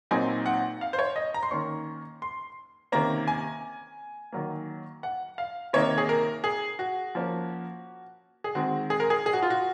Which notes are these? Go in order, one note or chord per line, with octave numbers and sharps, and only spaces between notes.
A#2 F#3 C4 D#4 G#5
F#5
F5
C5
C#5
D#5
A#5
C6
D#3 A#3 C#4 C#6
C6
C3 D#3 A#3 C#4 A#5
G#5
D#3 F#3 A#3
F#5
F5
C3 D#3 A#3 D#4 C#5
G#4
A#4
G#4
F#4
F3 A#3 C#4
G#4
D#3 G#3 C4 F#4
G#4
A#4
G#4
G#4
F#4
F4
F#4